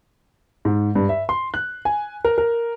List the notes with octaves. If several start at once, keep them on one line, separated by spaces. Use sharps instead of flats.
G#2
G2
E5
C6
F#6
G#5
A#4
A#4